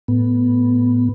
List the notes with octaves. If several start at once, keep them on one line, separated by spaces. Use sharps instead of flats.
A2 B3